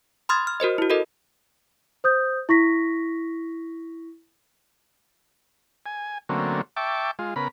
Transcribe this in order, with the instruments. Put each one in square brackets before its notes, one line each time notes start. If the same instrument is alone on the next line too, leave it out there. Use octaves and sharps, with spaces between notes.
[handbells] B5 C6 D#6 F6 G#6 A6
F6
F#4 A#4 C5 D#5
E4 F#4
F#4 A4 A#4 D#5
[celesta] C5 D#6 G6
E4 C#6 A#6 B6
[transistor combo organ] G#5
D3 F#3 A3 A#3 C4 C#4
E5 G5 A5 C#6 D6
G#3 F4
C#3 B3 A#4 B5